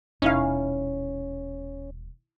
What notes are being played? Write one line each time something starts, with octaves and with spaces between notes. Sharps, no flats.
D#1 B2 C#4 D#4 E4 F5